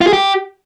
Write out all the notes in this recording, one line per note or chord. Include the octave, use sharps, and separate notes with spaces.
F4
G#4
G4